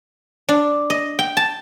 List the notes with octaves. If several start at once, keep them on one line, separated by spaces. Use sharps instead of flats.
D4
D#5
G5
A5